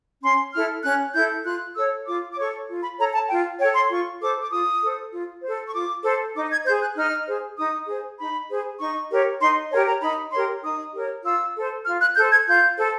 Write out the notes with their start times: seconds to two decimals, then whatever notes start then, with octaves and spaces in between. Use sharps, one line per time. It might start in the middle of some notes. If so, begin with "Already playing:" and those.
0.22 C#4 C6
0.53 E4 A4 F6
0.83 C#4 F#6
1.14 E4 A4 G6
1.45 F4 F#6
1.75 A4 C#5 E6
2.07 F4 D6
2.31 D6
2.37 A4 C#5 C#6
2.68 F4
2.82 B5
2.98 A4 C#5 A#5
3.13 A5
3.29 F4 G5
3.59 A4 C#5 G5
3.74 C6
3.90 F4 C#6
4.21 A4 C5 D6
4.40 D6
4.51 F4 D#6
4.82 A4 C5
5.12 F4
5.43 C5
5.48 A4
5.67 C#6
5.73 F4 D6
6.05 A4 C5
6.35 D#4 D6
6.50 G#6
6.65 G#4 C5 G6
6.81 F#6
6.96 D#4 F6
7.26 G#4 C5
7.58 D#4 D#6
7.88 G#4 C5
8.18 D#4 B5
8.49 G#4 C5
8.79 D#4 C#6
9.10 G4 A#4 C#5
9.40 D#4 C6
9.72 G4 A#4 C#5 A5
9.87 A#5
10.02 D#4 B5
10.32 G4 A#4 C#5 C6
10.63 D#4 D#6
10.93 G4 A#4 C#5
11.24 F4 E6
11.56 A4 C5
11.86 F4 F6
12.01 F#6
12.16 A4 C5 G6
12.32 G#6
12.47 F4 G6
12.77 A4 C5